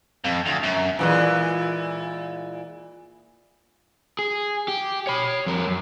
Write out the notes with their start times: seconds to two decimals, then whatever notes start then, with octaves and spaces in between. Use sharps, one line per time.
0.24 F2
0.46 D2
0.63 F#2
0.99 A#2 E3 G#3
4.19 G#4
4.68 G4
5.07 C#5 B5
5.46 F2 A#4
5.67 F#2